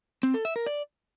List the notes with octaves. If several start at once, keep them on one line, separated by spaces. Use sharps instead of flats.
C4
A4
E5
A#4
D5